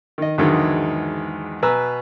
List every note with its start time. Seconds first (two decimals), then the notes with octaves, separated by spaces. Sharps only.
0.18 D#3 D#5
0.38 E2 G#2 D3 D#3 F#3 G#3
1.62 B2 B4 G#5 A#5 E6